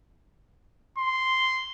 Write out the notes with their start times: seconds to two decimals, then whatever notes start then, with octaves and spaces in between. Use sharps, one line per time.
0.98 C6